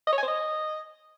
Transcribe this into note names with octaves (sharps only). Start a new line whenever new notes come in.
D#5
C#5
G#5
C5
D#5